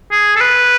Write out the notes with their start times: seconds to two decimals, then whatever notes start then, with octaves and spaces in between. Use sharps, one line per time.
0.12 G#4
0.36 A4
0.41 B4